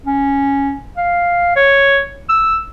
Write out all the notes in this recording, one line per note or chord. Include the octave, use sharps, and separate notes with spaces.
C#4
F5
C#5
E6